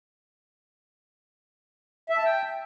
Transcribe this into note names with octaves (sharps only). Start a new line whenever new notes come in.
E5
A5
G5